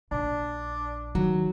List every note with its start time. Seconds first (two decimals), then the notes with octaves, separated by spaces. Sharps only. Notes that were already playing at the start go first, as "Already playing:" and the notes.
0.11 A#1 D4
1.15 D#3 F#3